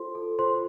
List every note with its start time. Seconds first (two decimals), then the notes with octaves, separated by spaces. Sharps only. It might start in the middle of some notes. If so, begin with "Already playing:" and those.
Already playing: F4 A4 C5 C6
0.15 A4
0.39 F4 C5 C6